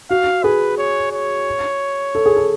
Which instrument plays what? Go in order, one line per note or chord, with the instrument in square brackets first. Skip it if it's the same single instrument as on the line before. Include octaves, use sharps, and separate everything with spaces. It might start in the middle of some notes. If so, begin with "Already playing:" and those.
[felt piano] F#4 [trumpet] F5
[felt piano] G#4 [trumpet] B4
[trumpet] C#5
C#5
[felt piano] A4
G#4
A4